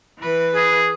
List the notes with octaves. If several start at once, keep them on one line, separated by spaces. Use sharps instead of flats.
E3 B4
G#4